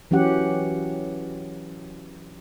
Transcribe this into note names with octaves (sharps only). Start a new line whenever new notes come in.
E3 F#3 C#4 G4 F#5